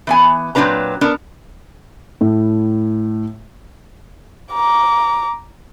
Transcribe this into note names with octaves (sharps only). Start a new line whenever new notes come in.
E3 B3 G#5
A#2 F#3 C4 D4 B4 A#5
B3 D4 A#4
A2
A#5 D6